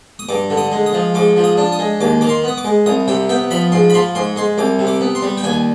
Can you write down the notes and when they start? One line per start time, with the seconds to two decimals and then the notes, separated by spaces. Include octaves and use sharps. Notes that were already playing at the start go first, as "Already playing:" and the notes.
0.19 D#6
0.29 G2 D6
0.50 D3
0.57 D#6
0.72 G#3
0.86 D#6
0.93 F3
1.14 G#2 D6
1.36 F3
1.44 D#6
1.57 D4
1.72 D#6
1.79 G#3
2.01 D#2 D6
2.21 D#3 D6
2.29 C6
2.44 B3 D#6
2.58 D6
2.65 G#3
2.86 C2 D#6
3.08 C3 G5
3.29 B3 G5
3.51 F3 B5
3.72 G#2 C6
3.90 B5
3.94 F3 C6
4.15 G#2 C6
4.36 G#3 C6
4.58 C2 D6
4.79 C3
4.87 D6
5.01 B3
5.15 C6
5.22 G3
5.37 G5
5.44 D#2 G#5